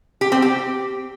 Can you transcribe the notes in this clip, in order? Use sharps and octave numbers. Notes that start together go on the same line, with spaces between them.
G4
C4
G4